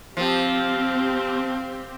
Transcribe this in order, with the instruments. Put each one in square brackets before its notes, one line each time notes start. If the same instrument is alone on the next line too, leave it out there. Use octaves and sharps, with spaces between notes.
[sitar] F3 [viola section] C4 G4